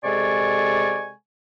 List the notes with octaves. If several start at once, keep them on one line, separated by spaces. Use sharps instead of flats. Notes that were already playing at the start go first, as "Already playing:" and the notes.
C3 G#3 A4 D5 G#5 C#6